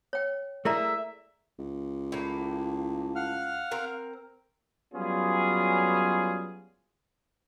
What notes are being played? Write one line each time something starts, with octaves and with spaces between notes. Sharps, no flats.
C#5 G5
A3 E4 G#4 A#4 D5 E5 A#5
C#2
A2 A#3
F5 F#5 F6
C4 A#4 A#5
F#3 G3 B3 C#4 F4 G#4